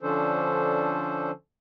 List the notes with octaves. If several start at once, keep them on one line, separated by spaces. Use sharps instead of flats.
D3 F3 C#4 D4 A4 C5